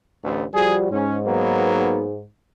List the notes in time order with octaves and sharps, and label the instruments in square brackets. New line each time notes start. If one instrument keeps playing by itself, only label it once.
[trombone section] A1 D2
[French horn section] F3 G3 F#4 [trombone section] G#4
[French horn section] G#2 [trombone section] C#4
[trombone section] F#3 A#3 B3